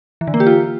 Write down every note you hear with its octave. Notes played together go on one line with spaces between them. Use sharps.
E3
D3
A#3
G4
F4